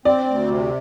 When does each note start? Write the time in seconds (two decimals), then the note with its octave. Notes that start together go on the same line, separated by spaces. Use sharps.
0.05 C4 D5
0.27 D2
0.48 C3